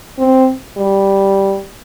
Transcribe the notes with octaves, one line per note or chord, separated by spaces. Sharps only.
C4
G3